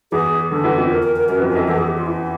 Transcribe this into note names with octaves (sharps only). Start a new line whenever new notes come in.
E2 E3 G#4
D3 A4
E2 E3
F2 F3
A#4
A#4
A#4
F#2 F#3 A#4
B4
F2 F3
A#4
F2 F3
A4
E2 E3 A4
G#4
G4
F4
E4